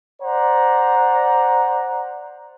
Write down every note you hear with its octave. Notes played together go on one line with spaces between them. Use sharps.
C5 D5 F#5 A#5